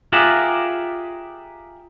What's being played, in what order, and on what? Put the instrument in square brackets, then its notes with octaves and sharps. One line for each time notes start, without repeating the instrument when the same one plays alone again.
[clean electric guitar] F4 G4 G#4 A#4 E5 F#5